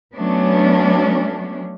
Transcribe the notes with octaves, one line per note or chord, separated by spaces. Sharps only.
F#3 A3 B3 C#4 D4